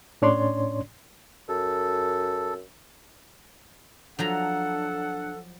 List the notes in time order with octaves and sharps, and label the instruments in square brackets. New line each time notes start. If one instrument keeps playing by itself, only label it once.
[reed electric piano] A2 C#4 D4 C#5 D5 C6
[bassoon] F#2 [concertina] A4
[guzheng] F3 F#3 A#5 [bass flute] D4 [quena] A4 [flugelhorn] F#5